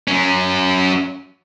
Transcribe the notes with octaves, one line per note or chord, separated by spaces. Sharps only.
F#3 C#4